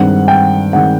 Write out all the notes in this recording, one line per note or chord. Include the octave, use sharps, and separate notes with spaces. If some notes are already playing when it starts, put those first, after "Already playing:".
Already playing: G2 D#3 G#3 C4 F#5
G5
D#3 G#3 C4 F#5